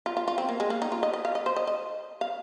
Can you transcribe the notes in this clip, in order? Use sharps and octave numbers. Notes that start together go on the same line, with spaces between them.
F4
F4
F4
C4
A#3
G#3
A#3
D#4
F4
D#5
D#5
F5
D#5
C5
D#5
D#5
F5